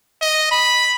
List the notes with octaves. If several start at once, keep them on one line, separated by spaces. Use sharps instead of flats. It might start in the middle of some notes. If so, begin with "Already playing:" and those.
D#5
B5